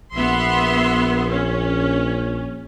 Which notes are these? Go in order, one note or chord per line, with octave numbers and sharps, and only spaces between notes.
A#1 B3 E5 C6
C#4